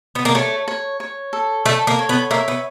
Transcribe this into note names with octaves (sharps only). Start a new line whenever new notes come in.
B3
A#3
A3 C#5
C#5
C#5
A4
A3 A4
A#3
C#5
B3
A#3 E5
B3